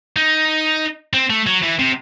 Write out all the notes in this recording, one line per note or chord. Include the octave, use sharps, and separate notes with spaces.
D#4
C4
A3
F#3
E3
C3